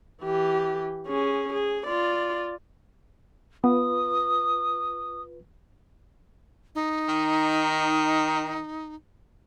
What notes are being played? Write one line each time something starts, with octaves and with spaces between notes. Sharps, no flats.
E3 G4
C#4 G#4
G#4
F4 D5
B3 F4 B4 D#6
D#4
D#3